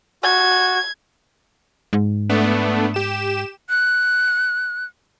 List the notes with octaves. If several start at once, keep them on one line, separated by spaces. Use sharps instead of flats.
F#4 G#6
G#2
A3 B3 D4
G4 E7
F#6